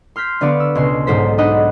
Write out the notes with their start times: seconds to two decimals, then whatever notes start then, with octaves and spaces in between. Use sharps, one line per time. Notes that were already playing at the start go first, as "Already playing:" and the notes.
0.16 C6 F6 G6 B6 C7
0.41 D3 B3 B4 D5 F5 C#6
0.60 E6
0.75 C#2 B2 C6
1.07 B1 G#2 A4 C5 B6
1.38 D4 D#4 D#5 F#5 B5